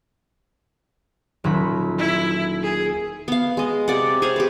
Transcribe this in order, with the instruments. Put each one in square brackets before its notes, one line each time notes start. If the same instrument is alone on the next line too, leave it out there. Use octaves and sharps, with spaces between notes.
[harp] D#1 F#3 B5
[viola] E4
G#4
[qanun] B3 F5
G#3 D#5
C3 D5 F#5
G#4 C5 C#5 F5
G4 B4